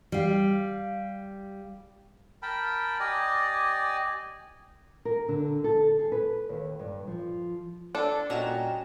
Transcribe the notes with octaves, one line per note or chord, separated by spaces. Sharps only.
G3 F5
A#4 G5 A5 B5
G4 D5 D#5 G#5
A#4
D3
A4
G#4
B4
D#2
G2
F3
D4 A4 B4
A#2 G3 C#4 F#4 G4 D#5 A#5 E7